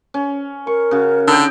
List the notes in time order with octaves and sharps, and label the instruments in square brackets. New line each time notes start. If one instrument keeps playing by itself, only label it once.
[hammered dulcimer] C#4
[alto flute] A#4 [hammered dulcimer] C#6
[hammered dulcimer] C#3 F#4
[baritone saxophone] D3 [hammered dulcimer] D#4 G5